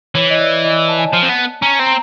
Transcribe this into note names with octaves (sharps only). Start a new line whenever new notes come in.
E3 C#5
D#5
D5
D#5
A5
G#5
A5
F3
C4
B3
C#4 A#5
C4
A#5